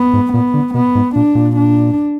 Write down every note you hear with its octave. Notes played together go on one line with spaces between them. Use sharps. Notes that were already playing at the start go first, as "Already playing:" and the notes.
Already playing: B3
G#2
A#2 B3
D3
B2 B3
G#2
A#2 D4
A#2
D4